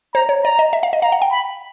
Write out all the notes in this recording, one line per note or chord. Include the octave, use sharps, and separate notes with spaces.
C5 A#5
C#5
D5 A#5
D#5
E5
F5
D#5
F5 A#5
F#5
G5
B5